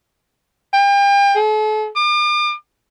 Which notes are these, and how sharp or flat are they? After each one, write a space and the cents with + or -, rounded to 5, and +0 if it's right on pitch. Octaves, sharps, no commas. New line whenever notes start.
G5 +35
A4 -40
D6 +40